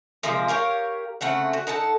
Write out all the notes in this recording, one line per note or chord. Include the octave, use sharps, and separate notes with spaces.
C3 F3 G#3 A#3
G4 A#4 C#5 F5
C#3 A3 C4 F#5
F#4
D#4 A4 F#5 A5